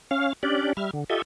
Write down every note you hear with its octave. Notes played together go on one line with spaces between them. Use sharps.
C#4 F5
C#4 D4 G4 D5
G3 E5 F6
D3
F4 G4 A4 D#5 E5